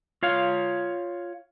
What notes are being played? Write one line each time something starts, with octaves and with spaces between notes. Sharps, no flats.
F4 C#5 F5